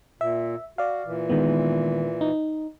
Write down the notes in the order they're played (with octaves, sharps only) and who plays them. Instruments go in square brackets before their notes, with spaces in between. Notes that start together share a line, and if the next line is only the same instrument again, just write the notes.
[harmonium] A#2 [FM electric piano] E5
[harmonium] F#4 [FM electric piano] D5 F5
[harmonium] A#2 E3
[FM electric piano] D#3 G#3 B3
D#4